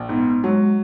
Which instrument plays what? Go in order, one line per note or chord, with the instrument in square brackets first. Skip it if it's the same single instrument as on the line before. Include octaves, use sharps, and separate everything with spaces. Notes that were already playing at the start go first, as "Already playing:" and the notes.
Already playing: [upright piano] A#1
[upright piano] G#2 [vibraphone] B3
[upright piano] F#3 [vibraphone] G#3